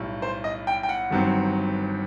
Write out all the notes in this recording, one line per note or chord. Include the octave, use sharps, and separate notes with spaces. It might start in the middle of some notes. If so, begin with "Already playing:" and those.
Already playing: B1 A2 G3
C5
D#5
G5
G5
F#5
G1 G2 D#3 F#3 C4